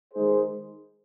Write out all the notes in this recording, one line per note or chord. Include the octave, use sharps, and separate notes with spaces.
D#3 G#3 D#4 G#4 C5